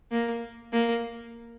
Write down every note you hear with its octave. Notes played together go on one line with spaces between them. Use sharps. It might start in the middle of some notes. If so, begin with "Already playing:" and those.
A#3
A#3